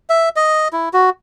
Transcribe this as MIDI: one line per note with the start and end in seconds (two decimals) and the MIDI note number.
0.10 0.29 76
0.36 0.68 75
0.73 0.89 64
0.93 1.10 66